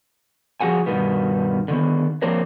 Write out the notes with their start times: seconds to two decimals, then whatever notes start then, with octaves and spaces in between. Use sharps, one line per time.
0.61 F3 F#4 G#4 F#5 G#5
0.86 G2 B2 D#3 B3
1.68 D3 D#3 B3
2.22 F3 A#3 C4 D4 A#4 C#5